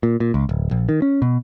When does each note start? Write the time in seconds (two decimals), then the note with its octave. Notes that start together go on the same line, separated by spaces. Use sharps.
0.03 A#2
0.20 A#2
0.34 C#2
0.49 D1
0.71 A#1
0.89 D#3
1.02 C#4
1.22 B2